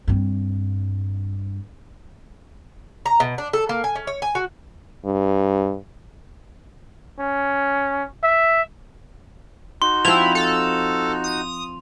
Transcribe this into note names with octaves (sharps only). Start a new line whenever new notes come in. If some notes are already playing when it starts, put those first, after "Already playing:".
G2 C4
A#5
B2
D4
A4
A#3
G#5
C#4
C#5
G#5
F#4
G2
C#4
E5
D#4 F#4 C6
F3 C4 E4 F7
A4
D#6